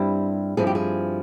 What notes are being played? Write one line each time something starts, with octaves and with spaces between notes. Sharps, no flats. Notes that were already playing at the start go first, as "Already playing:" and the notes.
Already playing: G2 G3 C4 E4
G2 F3 C4 E4 G#4
G4
G#4